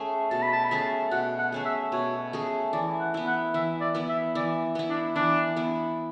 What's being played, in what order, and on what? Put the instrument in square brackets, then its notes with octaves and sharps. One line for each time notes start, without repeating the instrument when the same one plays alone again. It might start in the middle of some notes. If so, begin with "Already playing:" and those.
Already playing: [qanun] A3 C#4 G#4
[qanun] B2 [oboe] A5
[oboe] B5
A5
B5
[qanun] A3 C#4 G#4 [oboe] A5
[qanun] B2 [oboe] F#5
[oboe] F#5
[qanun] A3 C#4 G#4
[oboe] E5
[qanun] B2 [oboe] C#5
[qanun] A3 C#4 G#4
[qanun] E3 [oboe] D5
[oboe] F#5
[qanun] B3 E4
[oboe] F#5
[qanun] E3 [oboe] E5
[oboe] D5
[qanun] B3 E4
[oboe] E5
[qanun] E3 [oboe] D5
[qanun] B3 E4
[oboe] D4
[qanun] E3 [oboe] D4
[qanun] B3 E4